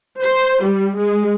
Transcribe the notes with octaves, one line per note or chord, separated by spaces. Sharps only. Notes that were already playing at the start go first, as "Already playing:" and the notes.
C5
G3
G#3